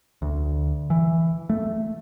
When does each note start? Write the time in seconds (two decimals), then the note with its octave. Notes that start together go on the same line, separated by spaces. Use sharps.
0.22 D2
0.90 E3
1.50 A3